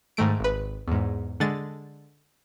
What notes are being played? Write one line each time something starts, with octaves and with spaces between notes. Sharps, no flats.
G#2 D#3 A3 D7
G#1 B4
E2 G#2
D3 G#3 A6